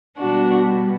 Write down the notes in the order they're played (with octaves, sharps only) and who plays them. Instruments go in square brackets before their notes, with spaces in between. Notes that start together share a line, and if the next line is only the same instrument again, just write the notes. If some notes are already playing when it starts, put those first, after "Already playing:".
[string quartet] B2 G3 B3 D4 F#4